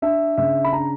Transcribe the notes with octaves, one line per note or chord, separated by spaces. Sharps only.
D4 E5
C#3 E5
B5
D4 A#5